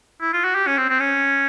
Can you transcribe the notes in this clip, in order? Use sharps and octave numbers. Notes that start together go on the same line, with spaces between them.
E4
F4
F#4
G4
C#4
C4
C4
C#4